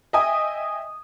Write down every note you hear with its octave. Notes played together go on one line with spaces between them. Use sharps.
D#5 E5 G5 G#5 D#6